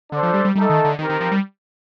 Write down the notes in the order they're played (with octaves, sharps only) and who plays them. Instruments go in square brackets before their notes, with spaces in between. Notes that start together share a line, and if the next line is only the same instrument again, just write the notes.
[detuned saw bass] D3 [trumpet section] D4 A4 C5
[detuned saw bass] F3
G3
G3
[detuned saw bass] G3 [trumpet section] A3 D#4 A4 D#5
[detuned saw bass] D#3
D3
[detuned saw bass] D#3 [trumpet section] C4 D#4 G4 A#4
[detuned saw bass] D#3
F3
G3